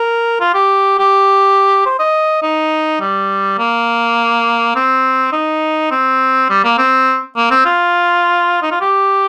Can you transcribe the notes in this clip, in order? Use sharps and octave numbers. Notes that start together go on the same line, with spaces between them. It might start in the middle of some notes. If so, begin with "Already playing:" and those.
Already playing: A#4
F4
G4
G4
C5
D#5
D#4
G3
A#3
C4
D#4
C4
G3
A#3
C4
A#3
C4
F4
D#4
F4
G4